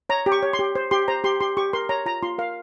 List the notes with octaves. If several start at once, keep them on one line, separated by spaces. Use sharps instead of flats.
C#5 A#5
G4
C#6
C#5
C6
G4
C5
G4 C6
C5 A#5
G4 C6
G4 C6
G4 C#6
A#4 C6
C#5 A#5
F4 A#5
F4 C6
A#4 F5